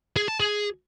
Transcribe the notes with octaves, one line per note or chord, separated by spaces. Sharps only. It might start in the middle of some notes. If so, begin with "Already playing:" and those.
G#4
A5
G#4